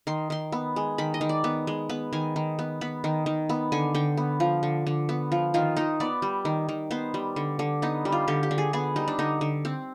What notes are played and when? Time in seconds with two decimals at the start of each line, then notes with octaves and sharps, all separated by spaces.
0.07 D#3 C6
0.30 D#3 C6
0.52 B3
0.76 G#3
0.98 D#3 B5
1.14 D#5
1.21 D#3
1.29 D5
1.44 B3
1.67 G#3
1.89 B3 B4
2.13 D#3 G#5
2.36 D#3
2.59 B3
2.81 B3 B5
3.04 D#3
3.26 D#3
3.49 B3
3.72 D3 G#5
3.95 D3 G5
4.17 B3
4.40 F3
4.63 D3
4.87 D3
5.09 B3
5.32 F3
5.54 D#3 F4
5.76 D#3 D#4
6.00 B3 D5
6.22 G3
6.45 D#3
6.69 D#3
6.91 B3 C5
7.14 G3
7.36 D3
7.59 D3
7.82 B3 D#4
8.05 G3
8.12 F4
8.28 D3 G4
8.43 G4
8.51 D3
8.58 G#4
8.73 B3 G#4
8.96 G3 D#4
9.08 D4
9.19 D3 D#4
9.41 D3
9.65 C4